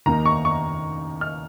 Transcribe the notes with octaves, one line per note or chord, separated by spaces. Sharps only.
D#2 D#3 A#3 D#4 A#5
C#6
C#6
F6